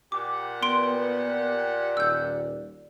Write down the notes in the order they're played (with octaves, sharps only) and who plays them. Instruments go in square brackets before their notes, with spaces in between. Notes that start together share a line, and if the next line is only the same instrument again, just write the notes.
[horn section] A#2 G4 F#5 [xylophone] D6
[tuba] B3 [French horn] D5 [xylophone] C6 D7
[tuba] D#1 [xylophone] E6 G6